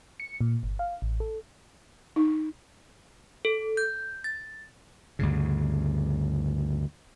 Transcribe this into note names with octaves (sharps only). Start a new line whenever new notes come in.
C#7
A#2
G1
F5
A1
A4
D#4
A4
G6
A6
D2 G2 C#3